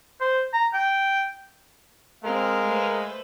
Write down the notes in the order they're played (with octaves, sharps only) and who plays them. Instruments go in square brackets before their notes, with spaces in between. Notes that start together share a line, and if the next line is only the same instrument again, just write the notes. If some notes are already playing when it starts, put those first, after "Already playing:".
[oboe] C5
A#5
G5
[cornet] G#3 [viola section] C4 [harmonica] A#4 F5
[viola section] A3 B4 C5